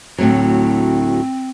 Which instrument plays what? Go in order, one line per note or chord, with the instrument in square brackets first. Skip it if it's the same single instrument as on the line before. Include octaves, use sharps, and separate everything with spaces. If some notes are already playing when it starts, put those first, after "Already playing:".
[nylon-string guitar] D2 A2 F#3 [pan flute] C4